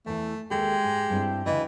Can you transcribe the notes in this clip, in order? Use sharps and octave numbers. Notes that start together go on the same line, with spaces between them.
E2 E3 A3
D#2 G#3 G4 A4
G#2
G2 C4 E4
D2 C#3 E3 D#5